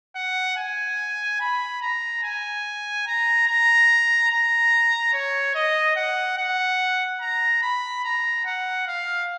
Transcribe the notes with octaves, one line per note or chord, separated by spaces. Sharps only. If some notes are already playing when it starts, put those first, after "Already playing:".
F#5
G#5
B5
A#5
G#5
A#5
A#5
A#5
C#5
D#5
F#5
F#5
A#5
B5
A#5
F#5
F5